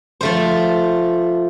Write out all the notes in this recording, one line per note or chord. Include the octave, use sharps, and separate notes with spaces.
F3 A3 C5